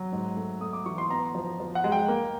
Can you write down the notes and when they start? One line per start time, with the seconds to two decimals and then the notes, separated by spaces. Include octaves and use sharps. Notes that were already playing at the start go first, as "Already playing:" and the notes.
Already playing: F#3
0.13 G#2
0.36 A3
0.61 A3 D#6
0.73 D6
0.86 E3 C#6
0.98 C6
1.10 B3 A#5
1.35 F3
1.60 F3
1.75 F#5
1.84 G#3
1.92 G5
2.08 A#3